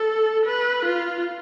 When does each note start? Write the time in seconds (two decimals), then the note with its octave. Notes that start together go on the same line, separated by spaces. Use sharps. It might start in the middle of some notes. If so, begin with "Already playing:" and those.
Already playing: A4
0.46 B4
0.86 F4